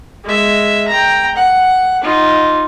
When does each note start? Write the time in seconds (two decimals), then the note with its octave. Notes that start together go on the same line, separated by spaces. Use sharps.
0.24 G#3 E5
0.88 G5 A#5
1.36 F#5
2.02 D#4 F4